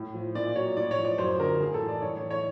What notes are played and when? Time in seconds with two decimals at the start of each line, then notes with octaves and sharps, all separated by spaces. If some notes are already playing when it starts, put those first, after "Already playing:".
Already playing: A2
0.14 F3
0.35 A#2 D5
0.56 F#3 C#5
0.77 A2 D5
0.91 C#5
0.97 F3
1.05 D5
1.18 F#2 C5
1.39 D3 F3 A#4
1.60 A2 G#4
1.74 A4
1.81 E3
1.89 D5
2.02 A2 C#5
2.17 C#5
2.23 E3
2.30 C#5